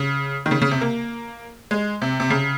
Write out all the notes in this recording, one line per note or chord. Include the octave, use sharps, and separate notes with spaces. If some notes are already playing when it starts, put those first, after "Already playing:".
Already playing: C#3
D#3
C#3
C#3
C3
A#3
G#3
C3
C3
C#3